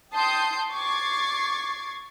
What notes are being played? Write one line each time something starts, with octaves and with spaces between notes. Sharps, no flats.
G5 A5 C6 D#6 G6 C7
C#6 D6 G#6 A6 C7